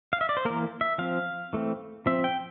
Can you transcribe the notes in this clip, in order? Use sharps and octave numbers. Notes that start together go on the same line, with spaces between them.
F5
E5
D5
C5
E3 A#3 A#4
E5
F3 C4 F5
E3 A3 C4
F3 C4 E5
G5